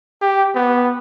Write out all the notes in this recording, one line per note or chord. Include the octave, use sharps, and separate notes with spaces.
G4
B3